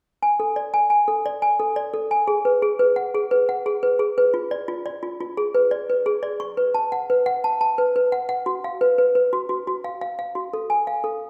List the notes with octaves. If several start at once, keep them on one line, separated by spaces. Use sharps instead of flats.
G#5
A4
D5
G#5
G#5
A4
D5
G#5
A4
D5
A4
G#5
G#4
B4
G#4
B4
F#5
G#4
B4
F#5
G#4
B4
G#4
B4
F4
D5
F4
D5
F4
F4
G#4
B4
D5
B4
G#4
D5
C#6
B4
A5
F#5
B4
F#5
A5
A5
B4
B4
F#5
F#5
F#4
F5
B4
B4
B4
F#4
F#4
F#4
F5
F5
F5
F#4
A4
G#5
F5
A4